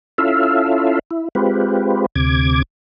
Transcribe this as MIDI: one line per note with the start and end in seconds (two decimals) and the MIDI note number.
0.18 0.99 61
0.18 0.99 64
0.18 0.99 65
0.18 0.99 69
0.18 0.99 76
0.18 0.99 77
1.11 1.28 64
1.35 2.06 56
1.35 2.06 60
1.35 2.06 65
1.35 2.06 67
1.35 2.06 71
2.16 2.62 38
2.16 2.62 48
2.16 2.62 86
2.16 2.62 92